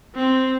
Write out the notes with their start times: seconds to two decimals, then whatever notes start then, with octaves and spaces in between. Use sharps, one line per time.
0.15 C4